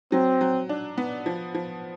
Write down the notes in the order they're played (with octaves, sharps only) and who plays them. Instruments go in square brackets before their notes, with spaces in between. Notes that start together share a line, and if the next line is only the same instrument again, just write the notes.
[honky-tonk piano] F#3 [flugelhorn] C4
[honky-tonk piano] F#3
D4
B3
F3
F3